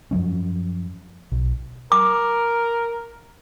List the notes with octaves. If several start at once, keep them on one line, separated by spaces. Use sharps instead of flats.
F#2 F3 F#3 C#4
B1
A#4 D6